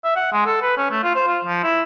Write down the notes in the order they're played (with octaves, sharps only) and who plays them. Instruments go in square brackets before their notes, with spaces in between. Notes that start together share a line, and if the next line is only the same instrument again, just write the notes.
[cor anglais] E5
F#5
G#3
A4
B4
C#4
A3
F4
C5
F4
F3
E4